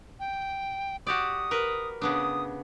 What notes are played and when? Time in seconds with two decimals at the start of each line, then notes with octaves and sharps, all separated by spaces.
0.20 G5
1.07 F#4 G4 D5 D#6
1.51 A#4 B4
2.01 C#3 B3 D4 D#6